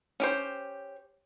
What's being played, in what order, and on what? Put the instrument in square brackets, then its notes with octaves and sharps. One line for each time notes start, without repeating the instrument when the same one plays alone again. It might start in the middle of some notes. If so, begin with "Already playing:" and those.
[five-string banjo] C#4 G4 C5